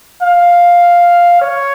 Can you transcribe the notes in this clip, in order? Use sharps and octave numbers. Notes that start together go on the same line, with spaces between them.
F5
C#5